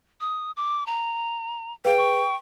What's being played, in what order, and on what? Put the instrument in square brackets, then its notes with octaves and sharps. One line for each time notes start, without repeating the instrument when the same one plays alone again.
[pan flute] D#6
D6
A#5
[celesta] G#4 B4 [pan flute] F5 [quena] G5
[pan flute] C#6